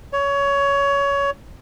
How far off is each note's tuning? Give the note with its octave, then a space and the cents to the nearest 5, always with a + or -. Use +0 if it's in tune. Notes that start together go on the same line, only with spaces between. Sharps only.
C#5 +20